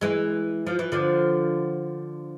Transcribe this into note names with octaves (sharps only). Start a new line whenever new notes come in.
E3 G#3
F3
E3
D3 F3